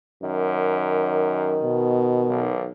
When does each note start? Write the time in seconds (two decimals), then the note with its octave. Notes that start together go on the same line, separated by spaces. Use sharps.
0.23 F#2 D#3
1.63 B2
2.29 B1